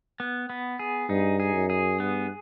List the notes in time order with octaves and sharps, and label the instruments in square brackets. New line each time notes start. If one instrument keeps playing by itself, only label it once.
[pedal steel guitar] B3
B3
G#4
[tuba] G2 [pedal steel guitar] D#4
[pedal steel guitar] G#4
[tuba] F#2
[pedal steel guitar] G#4
[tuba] G2 [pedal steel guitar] B3